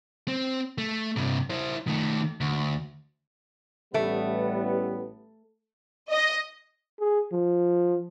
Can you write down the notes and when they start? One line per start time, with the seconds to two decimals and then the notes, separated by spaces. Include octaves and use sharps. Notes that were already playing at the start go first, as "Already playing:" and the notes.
0.28 C4
0.78 A3
1.17 G2 C3
1.50 E4 C5
1.87 D#3 A3
2.41 D2
3.94 A1 G3 A3 B3
6.12 D#5
7.00 G#4
7.32 F3